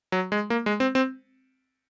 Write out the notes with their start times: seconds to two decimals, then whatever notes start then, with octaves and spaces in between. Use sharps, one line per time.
0.12 F#3
0.32 G#3
0.50 A#3
0.66 G#3
0.80 C4
0.95 C4